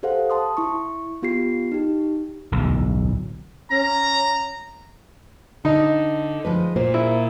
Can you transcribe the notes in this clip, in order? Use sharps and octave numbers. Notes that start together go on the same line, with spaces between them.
G4 A4 C5 F5 F#5
A5 C6 D#6
E4 C#6
B3 F4 G4 C7
D#4 G4
D1 B1 E2
C#4 A#5
D3 D#4
F3 G#3 B4
A#2 C5
E4